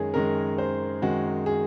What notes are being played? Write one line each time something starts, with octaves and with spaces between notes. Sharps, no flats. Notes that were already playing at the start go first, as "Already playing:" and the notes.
Already playing: F#2 D#3 G#3 G#4 C#5
F#2 D#3 G#3 A#4
C5
F#2 D#3 G#3 F#4
G#4